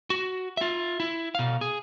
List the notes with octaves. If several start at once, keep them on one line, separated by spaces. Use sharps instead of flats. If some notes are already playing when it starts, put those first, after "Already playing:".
F#4
F4 E5
E4
B2 F5
G#4